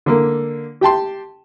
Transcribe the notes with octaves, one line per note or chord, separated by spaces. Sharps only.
D3 A#3
G4 G5 A5 C6